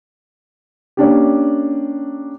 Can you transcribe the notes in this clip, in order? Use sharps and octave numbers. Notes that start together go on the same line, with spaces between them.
A#3 C#4 D4 G4